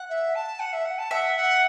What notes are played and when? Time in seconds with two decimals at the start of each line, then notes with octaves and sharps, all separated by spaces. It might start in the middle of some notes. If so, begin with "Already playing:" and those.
Already playing: F#5
0.09 E5
0.35 A5
0.60 F#5
0.73 E5
0.85 F#5
0.98 A5
1.11 E5 F#5
1.36 F#5